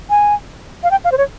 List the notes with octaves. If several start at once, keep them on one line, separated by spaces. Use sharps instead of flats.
G#5
F5
G5
F5
C5
C#5